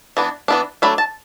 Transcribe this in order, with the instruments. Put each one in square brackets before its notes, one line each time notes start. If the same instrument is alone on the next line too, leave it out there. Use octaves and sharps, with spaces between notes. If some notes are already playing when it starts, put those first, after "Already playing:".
[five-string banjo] E3 B3 D4
E3 B3 D4
F#3 A3 D4 B5
A5